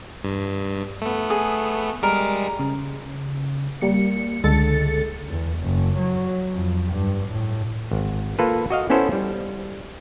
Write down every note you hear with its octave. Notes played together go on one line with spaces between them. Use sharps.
G2
A3 B3
G#4
G3 G#3 A#4
C#3
G3 A#3 C#7
C#2 D3 G#3 A4 A6 C#7
E2
F#1
F#3
F2
G2
A2
G#1
A#3 F4 A4 B4
F#4 D#5 F5
B3 C#4 E4 A4 C5 F5
G3